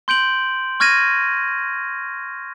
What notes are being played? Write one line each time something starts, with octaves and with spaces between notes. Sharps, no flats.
C6 G6 D7 F#7
C#6 F6 G#6 A#6 D#7